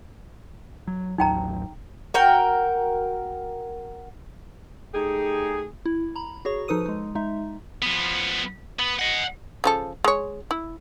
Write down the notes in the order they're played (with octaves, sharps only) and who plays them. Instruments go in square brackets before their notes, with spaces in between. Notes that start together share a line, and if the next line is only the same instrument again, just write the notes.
[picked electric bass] F#3
[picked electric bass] A1 D#2 F#3 [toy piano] D#4 G5 A#5
[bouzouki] F#4 A#4 G5
[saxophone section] A3 D#4 G4 G#4
[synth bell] E4
A#5 B5
F#4 G#4 C#5 C#6
F3 D#4 A4 B4 D#6 D#7
G#3 D#4
G#3 D#4 E5
[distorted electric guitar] F3 B3
B3
D#5 F#5
[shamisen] C#3 F3 A4
G#3 C#5
E4